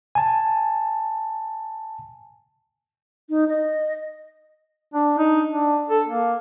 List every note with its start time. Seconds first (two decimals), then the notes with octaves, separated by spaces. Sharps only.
0.15 G#5 A5
3.30 D#4
3.49 D#5
4.94 D4
5.18 D#4
5.51 D4
5.90 A4
6.08 A#3